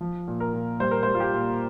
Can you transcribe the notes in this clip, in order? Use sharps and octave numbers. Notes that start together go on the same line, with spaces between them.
F3
A#2
A#4
A#2
G3 C5
A#4
G3 C5
F4
G4
A#2